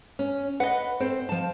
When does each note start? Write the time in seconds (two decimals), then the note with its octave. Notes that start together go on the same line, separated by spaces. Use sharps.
0.19 C#4
0.60 B4 D#5 F#5
1.00 C4 A4 C5
1.29 F3 A5